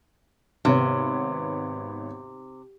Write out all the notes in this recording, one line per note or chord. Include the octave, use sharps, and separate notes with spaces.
G#1 C3 B3 C#5